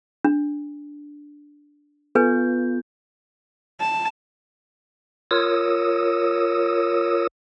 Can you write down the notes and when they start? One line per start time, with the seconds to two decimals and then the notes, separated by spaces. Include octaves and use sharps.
0.25 D4
2.15 B3 F4 A4 B4 G#5 G6
3.80 A5
5.31 F4 A#4 C#5 D#6 E6